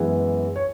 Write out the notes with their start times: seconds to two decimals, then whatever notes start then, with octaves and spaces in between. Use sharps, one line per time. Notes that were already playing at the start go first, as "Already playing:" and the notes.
Already playing: F#2 E3 G#3 B3
0.56 C#5